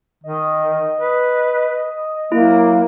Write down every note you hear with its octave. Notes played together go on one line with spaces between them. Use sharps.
D#3 D#5
B4
F#3 A#3 E4